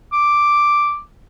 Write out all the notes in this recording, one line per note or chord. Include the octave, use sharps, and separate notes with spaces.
D6